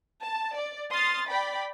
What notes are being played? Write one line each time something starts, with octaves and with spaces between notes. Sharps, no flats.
A5
D5
C6 D#6 F6 A6
D5 G5 B5